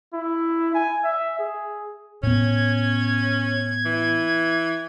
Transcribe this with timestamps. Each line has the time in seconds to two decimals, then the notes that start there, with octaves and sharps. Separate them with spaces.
0.13 E4
0.74 G#5
1.04 E5
1.39 G#4
2.23 A2 B3 C#4 G#6
3.85 E3